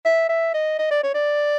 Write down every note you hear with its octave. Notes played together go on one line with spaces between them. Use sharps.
E5
E5
D#5
D#5
D5
C#5
D5